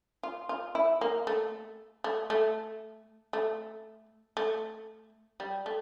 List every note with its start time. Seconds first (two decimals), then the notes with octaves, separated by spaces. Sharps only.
0.23 F4
0.49 F4
0.75 E4
1.01 A#3
1.27 A3
2.04 A3
2.30 A3
3.33 A3
4.37 A3
5.40 G3
5.66 A3